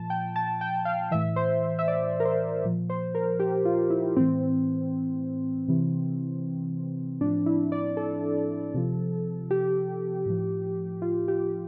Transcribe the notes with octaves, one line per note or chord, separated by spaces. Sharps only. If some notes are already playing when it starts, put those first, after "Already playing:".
Already playing: A#2 F3 A5
G5
A5
G5
F5
A2 E3 E5
C5
E5
D5
A#4
C5
A#2 F3
C5
A#4
G4
F4
E4
A2 E3 C4
C3 E3
A2 F3 D4
E4
D5
A4
C3 F3
G4
A2 F3
F4
G4